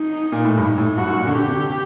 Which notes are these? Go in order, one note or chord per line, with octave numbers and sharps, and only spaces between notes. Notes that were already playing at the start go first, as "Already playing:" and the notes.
Already playing: D#4
A#2
A2
G2 D#4
A2
G2 F#4
F#2
A#2
D3
D3 G4
C3
D3